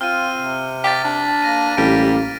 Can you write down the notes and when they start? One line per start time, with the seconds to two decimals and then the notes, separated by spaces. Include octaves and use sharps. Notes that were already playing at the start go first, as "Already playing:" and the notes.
0.01 C4 F4 F6 D#7
0.38 C3
0.84 G4 A6 B6
1.04 D4
1.42 A#3 A#6 D#7
1.77 A1 G3 D7